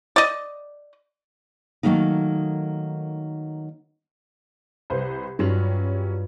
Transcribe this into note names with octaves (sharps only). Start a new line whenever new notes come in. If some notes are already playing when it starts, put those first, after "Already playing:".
D5 D#5
D#3 F3 F#3 A3 A#3 D#4
C2 B4 C5
G2 F#3 G3 C#4 F4 B4